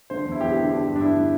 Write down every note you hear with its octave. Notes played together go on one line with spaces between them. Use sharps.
D3 C5
E2
E4
E2 G4
D3
D3 G4
G2
D4
G2 E4
D3